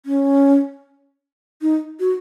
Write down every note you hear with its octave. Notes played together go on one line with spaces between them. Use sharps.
C#4
D#4
F#4